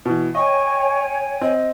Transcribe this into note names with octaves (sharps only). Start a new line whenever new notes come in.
B2 E3
C#5 D#5 G5 G#5 C#6
C4 D#5